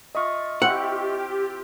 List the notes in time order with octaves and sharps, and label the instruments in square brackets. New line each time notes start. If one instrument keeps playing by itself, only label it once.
[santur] F4 D#6 [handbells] D#5 E5 C#6
[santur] C4 E4 F4 [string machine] G4 [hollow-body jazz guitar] F#5